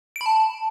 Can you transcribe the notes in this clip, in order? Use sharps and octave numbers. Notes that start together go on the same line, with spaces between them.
D7
B5
A5